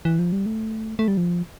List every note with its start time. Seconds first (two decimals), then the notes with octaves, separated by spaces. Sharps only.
0.05 E3
0.19 F3
0.32 G3
0.46 A3
0.99 A3
1.08 G3
1.17 F3